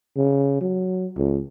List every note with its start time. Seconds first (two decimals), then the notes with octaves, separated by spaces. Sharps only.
0.17 C#3
0.61 F#3
1.16 C#2